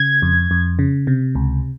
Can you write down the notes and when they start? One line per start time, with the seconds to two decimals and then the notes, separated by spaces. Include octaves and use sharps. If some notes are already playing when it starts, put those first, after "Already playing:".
Already playing: C#3 G#6
0.22 F2
0.51 F2
0.79 C#3
1.07 C3
1.35 C#2